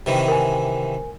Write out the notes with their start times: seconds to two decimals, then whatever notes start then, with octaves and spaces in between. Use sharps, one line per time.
0.06 C3 D#3 E3
0.28 A#4 G#5